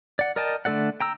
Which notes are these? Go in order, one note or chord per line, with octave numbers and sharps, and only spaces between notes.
D5 F#5
A#4 D5 D#5 G5 A5
D3 A3 A4 D5 F#5
G5 A#5 E6